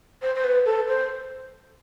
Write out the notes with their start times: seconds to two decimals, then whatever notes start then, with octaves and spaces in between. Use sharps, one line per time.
0.22 C5
0.35 C5
0.44 B4
0.66 A4
0.88 C5